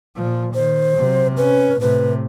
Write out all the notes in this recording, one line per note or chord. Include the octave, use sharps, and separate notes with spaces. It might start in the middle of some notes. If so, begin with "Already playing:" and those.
A#2 F3
D#3 C5
C3 F#3
C#4 B4
A2 C3 B4